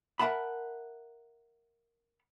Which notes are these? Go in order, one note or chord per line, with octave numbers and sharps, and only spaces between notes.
A#4 E5 F#5 A5 B5